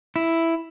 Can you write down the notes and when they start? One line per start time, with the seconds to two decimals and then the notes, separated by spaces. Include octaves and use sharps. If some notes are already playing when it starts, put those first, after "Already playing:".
0.16 E4